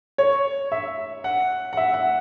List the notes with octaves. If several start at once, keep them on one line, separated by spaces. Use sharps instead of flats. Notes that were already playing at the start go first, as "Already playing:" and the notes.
C#5
E5
F#5
F#5
E5
F#5